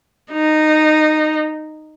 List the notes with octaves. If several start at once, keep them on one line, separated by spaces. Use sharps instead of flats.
D#4